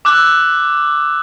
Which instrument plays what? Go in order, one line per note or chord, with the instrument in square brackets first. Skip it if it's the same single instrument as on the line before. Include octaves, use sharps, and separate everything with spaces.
[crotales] D6 E6 F#6